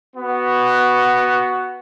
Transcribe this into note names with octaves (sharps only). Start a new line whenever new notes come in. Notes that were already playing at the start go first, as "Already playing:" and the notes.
B3 F#4